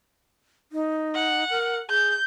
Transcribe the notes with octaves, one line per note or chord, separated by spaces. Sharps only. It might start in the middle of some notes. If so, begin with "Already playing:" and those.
D#4
F#5
A#4
G#4 G6